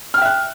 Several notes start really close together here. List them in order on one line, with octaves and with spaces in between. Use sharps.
F6 G5 E5 F#6